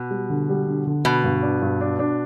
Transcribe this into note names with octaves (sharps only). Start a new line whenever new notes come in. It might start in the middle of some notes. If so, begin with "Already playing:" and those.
Already playing: B2
G3
D3
G3
D3
D3
B2 D3
G2
D4
G2
D4
D4